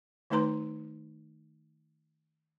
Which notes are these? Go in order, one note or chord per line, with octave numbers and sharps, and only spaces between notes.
D#3 A3 D#4 B4 A#5 C6